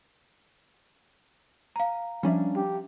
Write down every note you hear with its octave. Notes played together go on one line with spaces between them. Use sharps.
F5 A#5
F3 G3 C#4 D4 E5
G4